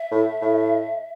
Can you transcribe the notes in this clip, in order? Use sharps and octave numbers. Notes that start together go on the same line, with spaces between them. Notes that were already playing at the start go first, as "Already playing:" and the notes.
Already playing: E5
A2
A2